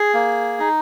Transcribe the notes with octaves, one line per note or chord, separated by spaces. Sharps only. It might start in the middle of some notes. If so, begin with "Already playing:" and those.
Already playing: G#4
A#3
D#4